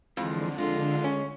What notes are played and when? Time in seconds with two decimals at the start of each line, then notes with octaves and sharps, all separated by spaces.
0.17 F2 D3 E3 F3 G#3
0.58 G#3 F4
1.04 C#4